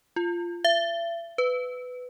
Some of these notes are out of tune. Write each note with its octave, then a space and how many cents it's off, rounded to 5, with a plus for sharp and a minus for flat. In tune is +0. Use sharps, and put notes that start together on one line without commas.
F4 -15
E5 +40
B4 +15